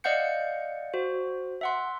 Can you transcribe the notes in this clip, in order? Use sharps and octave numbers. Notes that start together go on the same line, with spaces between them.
D5 D#5 F5 F#5 G6 C#7
F#4 C5
E5 F#5 C6